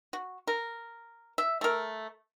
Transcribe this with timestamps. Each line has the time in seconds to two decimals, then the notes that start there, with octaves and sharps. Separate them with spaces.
0.13 F#4
0.47 A#4
1.38 E5
1.61 A3 A#4